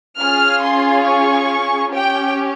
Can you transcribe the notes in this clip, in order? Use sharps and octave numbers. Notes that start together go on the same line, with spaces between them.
C#4 F4 G#4 F6
C6
C#6
C#4 G4 G5